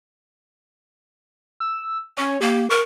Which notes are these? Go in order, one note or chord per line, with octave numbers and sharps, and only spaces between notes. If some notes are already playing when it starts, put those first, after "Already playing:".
E6
C#4 C#5
A#3 G4
A#4 C#6